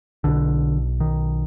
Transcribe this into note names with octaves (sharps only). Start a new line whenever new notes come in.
B1 B2 D3
D#3